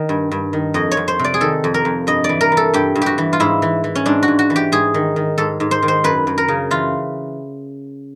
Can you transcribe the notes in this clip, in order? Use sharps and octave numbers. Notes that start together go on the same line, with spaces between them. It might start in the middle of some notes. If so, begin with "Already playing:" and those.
Already playing: D#3
G2
G2
D#3
F2 D#5
C#5
F2
C5
C3
D5
G#4
D#3 A4
F2
A#4
F2
G2 D#5
D5
E3
A#4
E3
A4
G2 G4
G2
F#4 G4
E3
F4
G#2 E4
E3
E3
C#4
G#2 D4
F#4
G#2
F#4
E3
G4
G#2 G#4
D#3
D#3
G#2 A4
G#2
C5
D#3
C5
F#2 B4
F#2
A#4
C#3
E3 F4